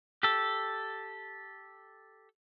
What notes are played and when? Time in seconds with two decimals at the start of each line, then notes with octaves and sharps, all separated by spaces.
0.23 G4 A4